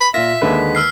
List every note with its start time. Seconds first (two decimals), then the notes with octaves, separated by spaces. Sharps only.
0.01 B5
0.14 A#2 F4 E5 A#6 B6
0.41 D#2 D3 D#3 G#3 B4
0.75 E6 F6 C7